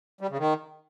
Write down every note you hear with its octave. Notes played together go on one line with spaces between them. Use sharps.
G3
C#3
D#3